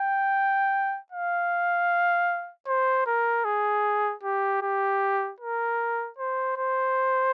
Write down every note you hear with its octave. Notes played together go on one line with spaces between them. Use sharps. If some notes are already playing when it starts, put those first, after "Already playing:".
Already playing: G5
F5
C5
A#4
G#4
G4
G4
A#4
C5
C5